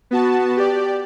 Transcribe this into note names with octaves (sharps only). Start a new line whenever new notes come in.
B3 F#4 A5
G4 D5